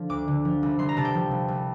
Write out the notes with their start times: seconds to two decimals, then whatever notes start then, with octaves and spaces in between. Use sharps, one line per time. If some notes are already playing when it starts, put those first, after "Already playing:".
Already playing: D3 F3
0.09 D2 D6
0.28 D3
0.45 F3
0.63 C2
0.79 C2 C6
0.89 A#5
0.97 C3 A5
1.05 G5
1.15 F3
1.31 C2
1.48 C2